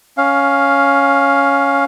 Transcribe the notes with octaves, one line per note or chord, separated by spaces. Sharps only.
C#4 F5